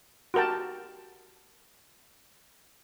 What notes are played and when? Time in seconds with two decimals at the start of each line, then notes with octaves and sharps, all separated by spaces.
0.34 F#4 G4 A#4 G5 A5